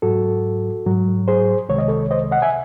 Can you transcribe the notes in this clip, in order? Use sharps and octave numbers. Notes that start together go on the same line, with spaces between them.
G#2 F#3 F#4 A4
G#2 F#3
G#4 C5
C2 C3 D#3 G#3 C#5
D#5
A4 C#5
C5 D#5
D#5 F#5
E5 G#5